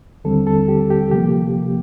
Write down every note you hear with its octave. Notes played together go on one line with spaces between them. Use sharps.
D#2 D3 G3 C4 A4
A4
G4
G4
C3 F3 A#3 G4